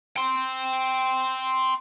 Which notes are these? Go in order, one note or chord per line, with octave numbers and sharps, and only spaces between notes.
G5 C6